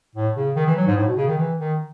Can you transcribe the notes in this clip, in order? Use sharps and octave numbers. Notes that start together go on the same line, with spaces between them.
A2
C#3
D#3
E3
F#3
G#2
A2
B2
C#3
D#3
E3
D#3